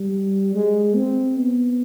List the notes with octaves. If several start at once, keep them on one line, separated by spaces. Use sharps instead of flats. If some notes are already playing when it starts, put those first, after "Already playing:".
Already playing: G3
G#3
C4
B3